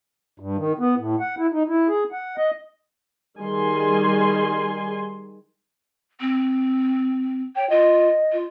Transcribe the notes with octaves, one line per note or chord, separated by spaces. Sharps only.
G2
D#3
B3
A2
F#5
E4
D#4
E4
G#4
F#5
D#5
D#3 G3 G#4 G#5 C6
C4
C#5 G5
F4 D#5
F4